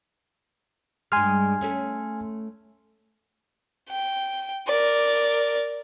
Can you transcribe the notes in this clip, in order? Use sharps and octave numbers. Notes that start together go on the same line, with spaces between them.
G2 G#3 G#5 C6 F6
A3 C#4 A4
G5
A#4 D5